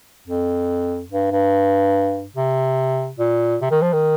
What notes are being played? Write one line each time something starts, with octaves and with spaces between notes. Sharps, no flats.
F2
G2
G2
C3
A#2
C3
D#3
F3
D#3